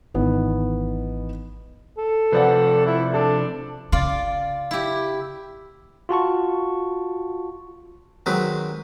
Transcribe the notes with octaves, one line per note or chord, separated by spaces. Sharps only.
G#1 D#3 E3 B3
A4
C3 F3 C4 B4 D5 F#5
E4
D4 A4 A5
C#3 F4 D5
E4 G4
F4 F#4 A5 C#6
D#3 F#3 G#3 C4 B4